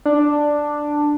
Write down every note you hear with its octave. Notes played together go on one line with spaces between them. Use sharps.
D4